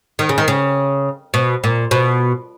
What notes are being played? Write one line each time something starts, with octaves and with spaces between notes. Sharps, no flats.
D#3
C#3
D#3
C#3
B2
A#2
B2